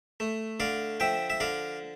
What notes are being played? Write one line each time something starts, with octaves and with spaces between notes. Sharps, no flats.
A3
D3 D5 F5
F3 E5 G5
E5
D3 D5 F5